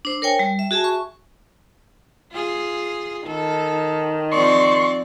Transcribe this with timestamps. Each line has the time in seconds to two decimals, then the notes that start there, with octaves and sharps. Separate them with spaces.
0.05 D4 C5
0.22 A#4 C#5 G5 G#5
0.39 G3
0.59 E5
0.71 F#4 G#4 E5 G#5 A5
0.84 C#6
2.32 F4 G#4
3.27 D#3 A4
4.32 F3 C4 D5 C6 C#6